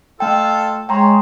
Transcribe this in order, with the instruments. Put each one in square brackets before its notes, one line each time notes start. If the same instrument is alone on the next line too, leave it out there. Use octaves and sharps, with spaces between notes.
[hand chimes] A3 G5 [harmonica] F4 A4
[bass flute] G#3 [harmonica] C#5 [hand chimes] G5 A#5 C6